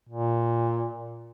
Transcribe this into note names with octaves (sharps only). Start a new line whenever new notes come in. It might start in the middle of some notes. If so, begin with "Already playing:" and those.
A#2